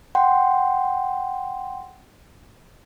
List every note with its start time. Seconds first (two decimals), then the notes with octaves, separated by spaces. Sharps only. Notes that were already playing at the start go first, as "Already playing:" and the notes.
0.15 F#5 G5 C6